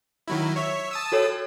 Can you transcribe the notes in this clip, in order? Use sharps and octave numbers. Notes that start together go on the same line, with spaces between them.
D#3 F#3 E4
C#5 E5
A5 D#6 E6
F#4 A4 C#5